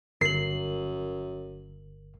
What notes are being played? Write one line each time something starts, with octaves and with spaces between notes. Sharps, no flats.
G1 F#2 A#4 C7 F#7